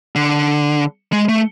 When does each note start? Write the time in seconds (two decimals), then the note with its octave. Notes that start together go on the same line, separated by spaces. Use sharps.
0.15 D3
1.12 G#3
1.29 A3